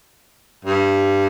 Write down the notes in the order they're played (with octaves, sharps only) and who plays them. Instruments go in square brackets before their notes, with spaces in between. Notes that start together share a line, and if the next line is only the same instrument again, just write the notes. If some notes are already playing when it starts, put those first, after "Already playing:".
[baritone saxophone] G2